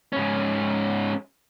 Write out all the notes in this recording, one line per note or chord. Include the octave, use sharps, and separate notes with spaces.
G#2 C#4